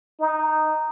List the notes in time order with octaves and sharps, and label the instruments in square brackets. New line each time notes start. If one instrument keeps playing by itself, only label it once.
[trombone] D#4